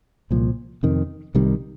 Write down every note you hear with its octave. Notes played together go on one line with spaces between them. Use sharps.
C2 A#2 F3
F2 C3 D#3
C2 C3 D#3 G3